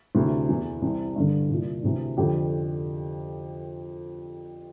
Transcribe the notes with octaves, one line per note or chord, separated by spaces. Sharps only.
D2 C3 E3
E2 E3
C2 C3 E3
G2 D3
C2 A#2
D2 C3 E3
F2 D3 G4